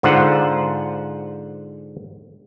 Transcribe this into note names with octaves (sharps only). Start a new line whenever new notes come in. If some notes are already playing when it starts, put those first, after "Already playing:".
G#2 D3 F4 C5 F#5